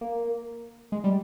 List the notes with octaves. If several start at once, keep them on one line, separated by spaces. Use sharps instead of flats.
A#3
G#3
G3